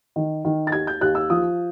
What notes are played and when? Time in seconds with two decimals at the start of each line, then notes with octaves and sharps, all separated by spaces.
0.16 D#3
0.45 D#3
0.67 A6
0.72 D#2 G#6
0.87 G6
1.01 D#2 F#6
1.15 E6
1.30 F3 D#6